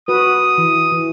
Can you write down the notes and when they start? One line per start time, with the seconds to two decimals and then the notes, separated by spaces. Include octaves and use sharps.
0.08 F#4 B4 D#6
0.58 E3
0.92 E3